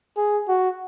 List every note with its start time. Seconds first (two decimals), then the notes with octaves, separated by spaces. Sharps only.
0.17 G#4
0.48 F#4